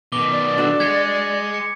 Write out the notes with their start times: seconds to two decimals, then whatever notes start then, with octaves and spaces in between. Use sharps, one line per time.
0.12 B2 D#3 D6 G7
0.31 D5
0.58 D4 F#4 A4
0.80 G#3 G#6 B6 C#7
1.54 C#7